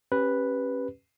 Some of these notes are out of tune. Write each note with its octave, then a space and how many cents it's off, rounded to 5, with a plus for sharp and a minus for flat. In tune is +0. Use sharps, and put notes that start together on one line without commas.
C#4 -25 G4 +0 B4 +0